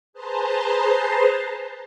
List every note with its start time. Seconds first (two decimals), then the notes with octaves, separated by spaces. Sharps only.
0.13 G#4 B4 C5 A5 A#5 C6